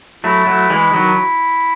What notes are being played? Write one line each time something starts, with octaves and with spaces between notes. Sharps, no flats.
F#3 A3 E4
F#3 A3
E3 G#3
D#3 F#3